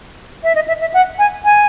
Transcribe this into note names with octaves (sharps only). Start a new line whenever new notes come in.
E5
D#5
E5
E5
F#5
G#5
G#5